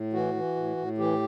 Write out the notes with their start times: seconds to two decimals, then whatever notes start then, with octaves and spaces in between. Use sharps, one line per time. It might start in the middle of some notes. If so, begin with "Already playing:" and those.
Already playing: A2
0.13 E3 F#4
0.34 E3
0.56 A2
0.77 A2
0.98 E3 G4